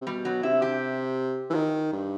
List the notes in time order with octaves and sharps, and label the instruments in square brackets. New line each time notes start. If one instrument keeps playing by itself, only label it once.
[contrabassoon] C3
[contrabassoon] B2 [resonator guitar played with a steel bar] G3
[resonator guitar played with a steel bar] F#3
[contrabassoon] C3 [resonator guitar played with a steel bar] E4
[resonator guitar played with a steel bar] G4
[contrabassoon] E3
D#3
G2